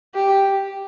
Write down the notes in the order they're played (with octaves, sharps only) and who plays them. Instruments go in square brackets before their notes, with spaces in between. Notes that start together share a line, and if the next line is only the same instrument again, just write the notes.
[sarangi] G4